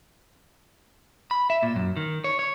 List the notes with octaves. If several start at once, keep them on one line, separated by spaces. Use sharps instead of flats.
B5
E5
A#2
F#2
D#3
C#5
C#5